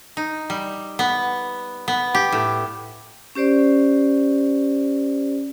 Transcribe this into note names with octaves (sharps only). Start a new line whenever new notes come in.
D#4
G3
B3
B3
G4
A2
C#4 G4 C5 D5